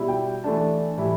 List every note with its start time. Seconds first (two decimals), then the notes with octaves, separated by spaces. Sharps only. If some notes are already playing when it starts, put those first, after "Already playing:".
Already playing: B2 G3 E4
0.08 G5
0.44 E3 A3 D4 A5
0.97 A2 E3 G3 E4